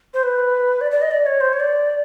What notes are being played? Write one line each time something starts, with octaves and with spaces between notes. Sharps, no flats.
C5
B4
D5
D5
D#5
D5
C#5
C5
C#5
D5